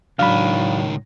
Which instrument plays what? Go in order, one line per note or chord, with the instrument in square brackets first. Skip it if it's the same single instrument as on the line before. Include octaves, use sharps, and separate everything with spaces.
[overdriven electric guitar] C#2 D#3 [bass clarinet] A2 [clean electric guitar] F#3 D4 [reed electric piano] F5 B5